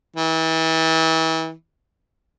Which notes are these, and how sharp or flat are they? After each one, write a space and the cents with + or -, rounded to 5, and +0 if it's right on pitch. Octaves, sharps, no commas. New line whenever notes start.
E3 -35